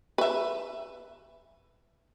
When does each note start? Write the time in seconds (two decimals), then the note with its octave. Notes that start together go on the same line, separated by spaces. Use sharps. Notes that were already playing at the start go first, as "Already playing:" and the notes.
0.18 B4 E5